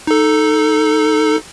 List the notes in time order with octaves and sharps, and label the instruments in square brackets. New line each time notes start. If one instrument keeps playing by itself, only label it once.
[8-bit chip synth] D#4 A4